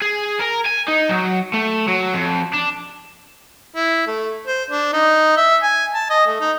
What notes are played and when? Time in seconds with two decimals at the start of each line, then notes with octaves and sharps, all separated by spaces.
0.02 G#4
0.39 A#4
0.66 G#5
0.88 D#4
1.09 F#3
1.53 A3
1.88 F#3
2.13 F2
2.53 D4
3.76 E4
4.07 A3
4.47 C5
4.71 D4
4.93 D#4
5.37 E5
5.63 G#5
5.94 A5
6.10 D#5
6.27 A3
6.41 D#4